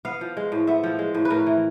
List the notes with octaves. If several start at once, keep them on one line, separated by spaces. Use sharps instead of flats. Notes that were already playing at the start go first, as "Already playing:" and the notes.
B3 F5
F3
G#3
A2
B3 E5
F3
G#3
A2
B4
A2 A#4
E3